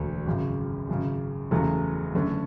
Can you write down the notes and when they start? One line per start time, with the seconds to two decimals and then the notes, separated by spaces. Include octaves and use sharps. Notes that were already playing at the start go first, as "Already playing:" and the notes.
Already playing: E1 D2 D3 A3
0.26 G#1 F#2 C#3
0.89 G#1 F#2 C#3
1.51 F#1 E2 C#3 F#3 A3
2.14 F#1 F#2 D3 A3 C#4